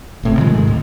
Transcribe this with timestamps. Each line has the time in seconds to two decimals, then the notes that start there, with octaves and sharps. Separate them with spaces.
0.23 G1 A2 C3
0.38 C3 D#3 F3 G#3
0.54 G#2 D#3
0.68 D2